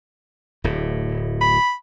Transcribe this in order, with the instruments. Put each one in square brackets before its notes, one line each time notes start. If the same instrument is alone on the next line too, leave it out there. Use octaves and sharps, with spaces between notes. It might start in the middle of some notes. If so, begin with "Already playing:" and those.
[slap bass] D1 A2
[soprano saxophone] B5